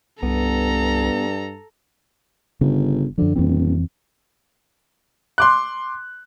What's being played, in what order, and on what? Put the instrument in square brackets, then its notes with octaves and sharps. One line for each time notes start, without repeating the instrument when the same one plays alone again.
[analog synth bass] C2 [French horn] G2 [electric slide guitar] B3 [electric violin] A4 A#5
[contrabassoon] G1 [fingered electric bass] C#3
[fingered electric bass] F#2 F3 [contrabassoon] D3
[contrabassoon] D#1 [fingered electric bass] F2 E3 C4
[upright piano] C6 D6 F#6